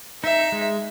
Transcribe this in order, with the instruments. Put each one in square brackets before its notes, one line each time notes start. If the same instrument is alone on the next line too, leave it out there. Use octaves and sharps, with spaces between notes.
[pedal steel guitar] D#4 [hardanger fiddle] E5
[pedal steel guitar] G#3